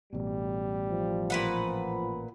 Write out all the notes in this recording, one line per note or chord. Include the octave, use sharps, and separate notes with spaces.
A1 B2 G3
F3
A#2 B4 F#5